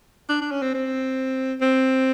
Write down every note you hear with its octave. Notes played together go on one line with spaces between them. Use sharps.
D4
D4
C#4
C4
C4
C4